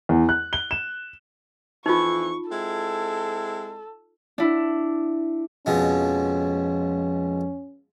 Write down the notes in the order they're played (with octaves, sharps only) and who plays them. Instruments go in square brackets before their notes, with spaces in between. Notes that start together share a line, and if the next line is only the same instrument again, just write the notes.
[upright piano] E2
F#6
G7
E7
[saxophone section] F2 E3 [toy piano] D#4 F4 [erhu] C#6
[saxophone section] G#3 C4 E4 [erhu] A4
[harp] D4 E4
[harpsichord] F2 B2 G#3 [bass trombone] C#4